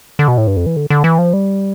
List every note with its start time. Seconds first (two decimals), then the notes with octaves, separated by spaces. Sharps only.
0.19 D3
0.28 B2
0.38 A2
0.47 G2
0.57 F2
0.66 E3
0.76 D3
0.90 D3
1.04 E3
1.18 F3
1.33 G3